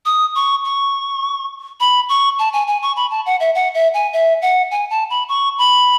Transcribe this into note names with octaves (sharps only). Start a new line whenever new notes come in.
D#6
C#6
C#6
B5
C#6
A5
G#5
G#5
C#6
B5
A5
F#5
E5
F#5
E5
G#5
E5
F#5
G#5
A5
B5
C#6
B5